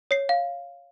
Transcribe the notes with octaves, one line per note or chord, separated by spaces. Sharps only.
C#5 C7
F5